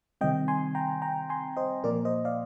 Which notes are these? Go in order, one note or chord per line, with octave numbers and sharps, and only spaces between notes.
C3 D#3 G3 C4 D#5 G5
G#5 C6
G5 A#5
G5 A#5
G#5 C6
C5 D#5
A#2 F3 A#3 A#4 D5
C5 D#5
D5 F5